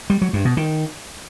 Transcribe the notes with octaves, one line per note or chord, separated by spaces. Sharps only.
G3
F#3
G2
B2
D#3